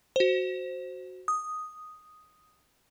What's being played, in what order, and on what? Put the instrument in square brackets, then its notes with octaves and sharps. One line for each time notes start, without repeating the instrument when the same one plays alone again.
[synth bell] F#4 C5
D#6